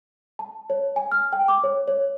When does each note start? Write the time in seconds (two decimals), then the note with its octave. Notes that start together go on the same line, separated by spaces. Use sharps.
0.39 A5
0.70 C#5
0.96 G#5
1.12 F6
1.33 G5
1.48 D6
1.64 C#5
1.88 C#5